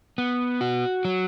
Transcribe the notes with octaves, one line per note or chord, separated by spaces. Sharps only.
B3
F#4
F#3